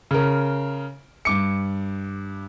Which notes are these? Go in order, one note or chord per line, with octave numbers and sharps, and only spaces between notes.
C#3 A#4
G2 D6 C#7